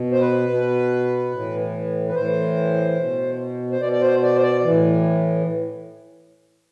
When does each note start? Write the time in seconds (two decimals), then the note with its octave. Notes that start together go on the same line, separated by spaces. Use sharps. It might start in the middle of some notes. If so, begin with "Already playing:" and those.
Already playing: B2
0.12 C5
0.21 B4
0.49 B2
1.32 A2 E3
2.08 B4
2.15 A2 E3 C5
2.98 B2
3.72 C5
3.81 B2 D5
3.92 D5
4.01 C5
4.23 D5
4.36 C5
4.43 D5
4.63 A2 E3